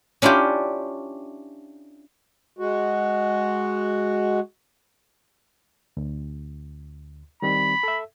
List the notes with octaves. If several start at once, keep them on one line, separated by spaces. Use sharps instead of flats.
C#4 D4 E4 F4 G4
G#3 F#4
D2
D#3 G3 C4 B5
A4 E5